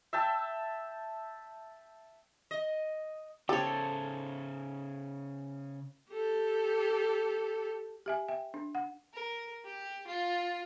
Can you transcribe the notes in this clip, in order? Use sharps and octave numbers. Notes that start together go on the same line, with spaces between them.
E5 G5 A5 E6
D#5
C#3 G4 A4 C5 C#5
G4 A4
G4 E5 G#5
E5 G5
D4
F#5
A#4
G4
F4